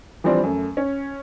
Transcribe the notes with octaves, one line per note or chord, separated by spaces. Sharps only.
E3 F3 G3 C4 D4
F#2 A3
C#4